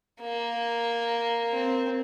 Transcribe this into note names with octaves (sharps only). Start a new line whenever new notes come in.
A#3
C4